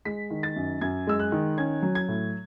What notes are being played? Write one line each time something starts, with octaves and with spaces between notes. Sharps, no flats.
G#3 B6
D#3
A6
F#2
F#2 G#6
G#3 E6
F#6
D#3
C#4 G#6
F#3
G#6
A2